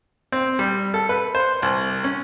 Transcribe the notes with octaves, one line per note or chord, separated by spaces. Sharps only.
C4
G3
A4
B4
C5
C2
C#4